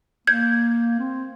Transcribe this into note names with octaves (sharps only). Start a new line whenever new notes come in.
A#3 G6 G#6
C4